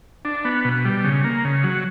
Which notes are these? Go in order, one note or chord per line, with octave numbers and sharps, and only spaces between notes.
D4
B3
B2
G3
C#3
A#3
C#3
F#3